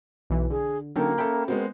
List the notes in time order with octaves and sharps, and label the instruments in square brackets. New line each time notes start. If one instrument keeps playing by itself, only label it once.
[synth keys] B1 E3
[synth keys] D3 [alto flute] G#4
[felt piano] D3 C#4 A4 [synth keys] F#3 D#4 G5 [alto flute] A#3
[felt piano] C#4 A4 [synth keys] E5 G5 B5
[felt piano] G#3 B3 C4 [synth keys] F#4 [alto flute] A#4